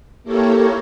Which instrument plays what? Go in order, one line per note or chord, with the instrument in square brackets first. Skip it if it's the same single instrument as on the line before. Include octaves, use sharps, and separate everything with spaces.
[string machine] A#3 E4 G4 A4 A#4 C#5